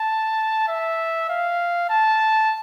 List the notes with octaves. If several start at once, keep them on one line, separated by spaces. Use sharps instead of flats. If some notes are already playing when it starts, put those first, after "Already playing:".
Already playing: A5
E5
F5
A5